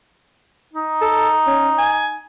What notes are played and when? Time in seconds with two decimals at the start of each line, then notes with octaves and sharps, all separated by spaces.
0.74 D#4
1.02 A4
1.47 C#4
1.78 G#5